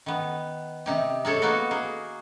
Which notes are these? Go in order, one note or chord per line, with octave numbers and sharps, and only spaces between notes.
D#3 B3
C3 D#4 G4
D#4 G#4 A4 C#5
A#3 B3 D#4 F#4 A4
A#3 G#4